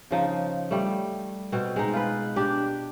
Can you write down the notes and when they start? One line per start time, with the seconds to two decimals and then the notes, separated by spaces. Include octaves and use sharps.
0.11 C#3 F3 D#4
0.71 G3 A3
1.52 B2 C4
1.76 G#3 D#4
1.93 F4 B4
2.36 D4 G4